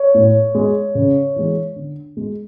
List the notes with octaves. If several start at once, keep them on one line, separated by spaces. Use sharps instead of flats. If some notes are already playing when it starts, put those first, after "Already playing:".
Already playing: C#5
A2
G#3
C#3
E3 G#3
D3
G#3